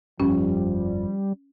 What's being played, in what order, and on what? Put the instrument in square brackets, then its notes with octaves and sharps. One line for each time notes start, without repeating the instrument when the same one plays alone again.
[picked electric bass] G1 F2 [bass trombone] F3 [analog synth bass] G3 [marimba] C#4